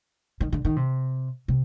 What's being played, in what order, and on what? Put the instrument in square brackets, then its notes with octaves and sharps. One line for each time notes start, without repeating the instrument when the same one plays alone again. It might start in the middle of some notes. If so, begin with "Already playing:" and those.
[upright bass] D#3
D3
D#3
C3
C3